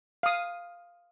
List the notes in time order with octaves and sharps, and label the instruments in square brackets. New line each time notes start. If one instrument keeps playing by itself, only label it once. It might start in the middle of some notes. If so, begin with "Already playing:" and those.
[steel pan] F5 D#6